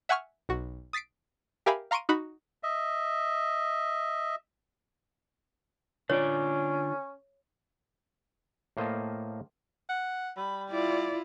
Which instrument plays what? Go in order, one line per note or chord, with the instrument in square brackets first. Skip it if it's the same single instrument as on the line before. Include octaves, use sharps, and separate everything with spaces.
[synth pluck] E5 F#5 G#5 C#6 F6
B1 F#4
D#6 A6 B6 C7 D7
G4 A#4 E5 F5 G#5 B5
F5 A#5 C6 C#6 D7 D#7
D#4 F#4 F#5 B5
[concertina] D#5 E5
[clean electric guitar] D3 F4 D5 [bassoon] C#4 [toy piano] C#5
[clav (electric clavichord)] A2 A#3 C5 D#5 F5 A5
[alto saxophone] F#5
[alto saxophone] G3 [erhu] B5
[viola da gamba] E4 F4 [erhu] D5